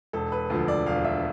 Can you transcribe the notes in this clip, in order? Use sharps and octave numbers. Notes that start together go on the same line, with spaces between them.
E1 A4
B4
D2 D3 F3
D5
E1 F5
E5